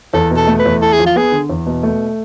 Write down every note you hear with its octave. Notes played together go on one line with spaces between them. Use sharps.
E2 A4
B2
A4
A3
B4
E2
E4 A4
G#4
F3
F4
B3 G#4
D3
E2
B2
A3